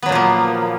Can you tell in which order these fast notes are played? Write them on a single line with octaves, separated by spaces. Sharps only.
B3 F#3 A#2 F3 A#3